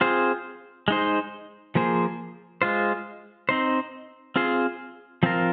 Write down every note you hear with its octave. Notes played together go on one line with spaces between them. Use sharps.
C4 F4 G#4 C5
G#3 D#4 C5
F3 A#3 G#4 C5
G#3 F4 C5
C4 D#4 C5
C4 F4 G#4 C5
F3 C4 F4 A#4